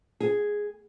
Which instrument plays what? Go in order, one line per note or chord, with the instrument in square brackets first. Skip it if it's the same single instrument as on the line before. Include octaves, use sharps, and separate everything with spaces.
[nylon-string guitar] G#4